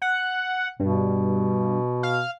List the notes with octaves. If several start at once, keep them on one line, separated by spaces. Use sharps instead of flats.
F#5
G2 B2
F5